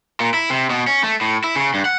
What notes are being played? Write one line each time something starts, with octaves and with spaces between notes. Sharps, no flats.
A#2
E4
C3
B2
C#4
A3
A2
E4
C#3
G2
F#5